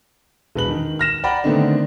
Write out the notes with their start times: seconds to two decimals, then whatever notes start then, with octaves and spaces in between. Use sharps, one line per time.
0.55 E1 B4 F#7
0.68 D#3
0.99 F6 A#6 E7
1.24 D5 F#5 G5 A#5 B5
1.44 D3 D#3 A3 B3 C4 D4